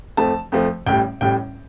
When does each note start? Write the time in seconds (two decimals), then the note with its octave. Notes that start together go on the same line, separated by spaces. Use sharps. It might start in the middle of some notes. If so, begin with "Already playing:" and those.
0.17 F2 F3 A3 A5
0.52 F2 F3 A3
0.86 A1 A2 G3 G5
1.21 A1 A2 G3 G5